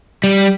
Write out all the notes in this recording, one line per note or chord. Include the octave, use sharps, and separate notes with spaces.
G3